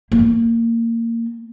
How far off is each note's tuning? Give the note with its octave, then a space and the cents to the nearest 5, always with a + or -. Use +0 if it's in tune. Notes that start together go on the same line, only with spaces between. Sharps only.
A#3 -20